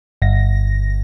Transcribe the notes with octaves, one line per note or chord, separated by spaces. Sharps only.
G1 A#6